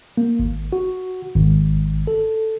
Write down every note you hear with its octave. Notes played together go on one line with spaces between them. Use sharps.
A#3
G#1
F#4
G#1
A4